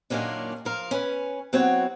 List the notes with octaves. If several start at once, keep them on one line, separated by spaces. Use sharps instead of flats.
F#2 A#2 D#3 A#3 C#4 D4
F3 A#4 F5
C#4 B4
F#3 B3 C4 E4 F#4 C#5